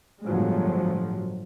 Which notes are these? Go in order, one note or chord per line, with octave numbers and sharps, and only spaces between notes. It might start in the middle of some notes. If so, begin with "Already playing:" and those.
G1 A2 F3 F#3 G#3